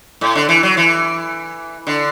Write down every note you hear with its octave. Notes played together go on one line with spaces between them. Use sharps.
A2
D3
E3
F#3
E3
D3